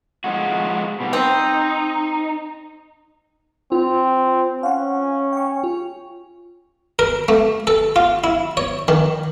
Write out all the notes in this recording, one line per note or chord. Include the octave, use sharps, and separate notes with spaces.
F3 G#3 F#4
B2 G3
C4 D#4
C4 F4
C#4 F5 F#5
G5 C#6
F4
A#4
A3
A4
F4
E4
C#5
D#3